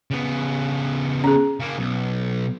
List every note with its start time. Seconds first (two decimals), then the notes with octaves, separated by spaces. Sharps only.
0.11 C#3 B3
1.24 C#4 G#4
1.60 C#3 A#3
1.79 B1